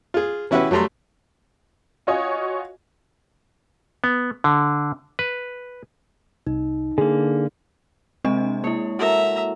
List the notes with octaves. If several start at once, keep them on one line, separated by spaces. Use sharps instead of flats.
F4 G#4
E3 C#4 E4 F#4 G4 B4
F#3 G3 A3 A#5 C6
F4 F#4 C#5 D#5 G#5
B3
D3
B4
C2 D#4
D3 A#3 G#4
C3 G#3 C4 D4 D#5
A#3 E4 C#5
F#4 A4 A#4 E5 A#5